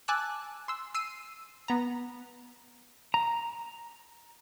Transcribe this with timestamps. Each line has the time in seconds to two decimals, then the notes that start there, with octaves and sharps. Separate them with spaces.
0.08 G#5 A5 D6 E6 F#6
0.68 C6 E6
0.95 E6 C7 D#7
1.68 B3 A#5
3.14 A#5